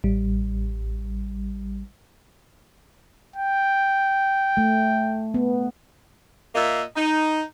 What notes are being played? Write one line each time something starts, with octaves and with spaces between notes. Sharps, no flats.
A1 G3
G5
A3
B3
A#2 A#3 D#5 E5
D#4